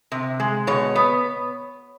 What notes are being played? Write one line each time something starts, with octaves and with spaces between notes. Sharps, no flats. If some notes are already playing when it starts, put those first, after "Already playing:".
C3
G#3
B2 C#5
B3